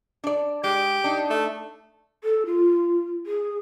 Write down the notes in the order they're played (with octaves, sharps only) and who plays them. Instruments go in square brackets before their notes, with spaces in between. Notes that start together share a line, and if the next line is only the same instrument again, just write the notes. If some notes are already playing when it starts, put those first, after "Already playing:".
[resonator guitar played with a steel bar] D4 D5
[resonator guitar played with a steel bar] G#3 [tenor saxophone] G4
[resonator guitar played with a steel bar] D4 D#4
[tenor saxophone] A3
[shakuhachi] A4
F4
G#4